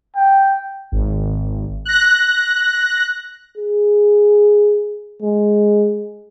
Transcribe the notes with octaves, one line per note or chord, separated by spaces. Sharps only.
G5
G#1
F#6 A#6
G#4
G#3